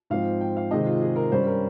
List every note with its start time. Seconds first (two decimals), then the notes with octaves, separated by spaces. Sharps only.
0.10 G#2 F3 C4 F5
0.41 G5
0.57 F5
0.71 C3 D#3 G#3 C4 D#5
0.86 F4
1.02 G#4
1.16 A#4
1.32 G2 G3 C#4 C5
1.47 A#4